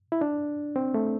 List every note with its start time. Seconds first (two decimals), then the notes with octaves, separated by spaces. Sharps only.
0.12 E4
0.21 D4
0.76 C4
0.94 A3